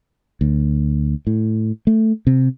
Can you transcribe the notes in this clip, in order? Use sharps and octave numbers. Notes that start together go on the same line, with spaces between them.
D2
A2
A3
C3